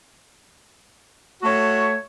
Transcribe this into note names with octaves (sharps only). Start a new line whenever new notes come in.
A3 F#4 C#5